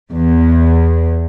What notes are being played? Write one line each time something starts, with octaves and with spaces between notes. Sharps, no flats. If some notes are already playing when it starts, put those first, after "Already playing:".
E2